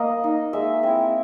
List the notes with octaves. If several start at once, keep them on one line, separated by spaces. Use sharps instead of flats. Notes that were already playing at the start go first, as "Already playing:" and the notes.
Already playing: A#3 D#5
D#4
G#3 E5
C4 E4